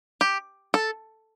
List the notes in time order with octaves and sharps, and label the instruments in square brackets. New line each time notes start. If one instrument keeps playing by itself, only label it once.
[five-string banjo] G4
A4